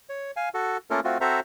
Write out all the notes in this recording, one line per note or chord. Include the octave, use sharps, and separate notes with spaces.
C#5
F5 G#5
F#4 A4
A3 A#3 C#4 F4 A4 A#4
A3 C4 F4 F#4
C4 F#4 A4 C5 E5 A#5